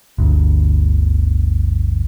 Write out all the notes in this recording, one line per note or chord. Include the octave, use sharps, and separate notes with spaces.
G1 D2